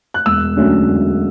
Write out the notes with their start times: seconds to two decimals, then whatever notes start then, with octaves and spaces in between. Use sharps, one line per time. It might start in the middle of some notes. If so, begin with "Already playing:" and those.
0.14 F#6
0.26 E1 E6
0.57 D2 D3 F#3 C#4
0.89 E1